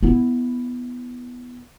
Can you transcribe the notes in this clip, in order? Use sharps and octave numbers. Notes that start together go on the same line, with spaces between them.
B3 E4